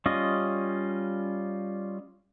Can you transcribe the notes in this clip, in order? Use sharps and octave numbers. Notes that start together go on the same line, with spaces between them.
G3 C#4 F4 D#5